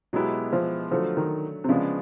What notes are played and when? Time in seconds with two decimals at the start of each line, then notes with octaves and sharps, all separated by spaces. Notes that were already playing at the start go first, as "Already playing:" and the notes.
0.13 B2 F#3 G#3 B3 E4 G4
0.53 F3
0.91 D3 F3 F#3 A3
1.17 D#3
1.64 C3
1.69 C#3 F3 G#3 B3 D4